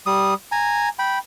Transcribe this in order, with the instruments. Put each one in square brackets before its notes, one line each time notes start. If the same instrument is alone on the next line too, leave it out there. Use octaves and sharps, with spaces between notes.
[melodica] G3 D#6
G#5 A#5
G5 B5